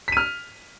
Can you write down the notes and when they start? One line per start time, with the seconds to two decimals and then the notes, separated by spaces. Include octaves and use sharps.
0.08 B6
0.12 D#7
0.17 F6